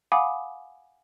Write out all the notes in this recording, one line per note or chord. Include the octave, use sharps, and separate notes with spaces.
F5 F#5 G#5 B5 D6 D#6